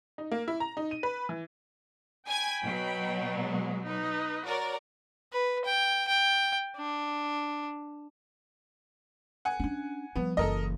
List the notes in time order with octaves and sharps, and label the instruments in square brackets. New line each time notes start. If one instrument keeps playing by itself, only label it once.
[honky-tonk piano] D#4
A#3
E4
A#5
D#4
D#7
B4
E3
[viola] G5 B5 [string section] G#5 G#6
[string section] B2 F#3
[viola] G#3
D#4 B4
[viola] F#4 C#5 [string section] A#4 D5
[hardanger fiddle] B4
G5
G5
D4
[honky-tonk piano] F#5 G#5
[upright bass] C#4 D4
[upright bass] F3 G3 [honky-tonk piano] B3
[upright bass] F#1 E3 [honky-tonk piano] A4 A#4 D#5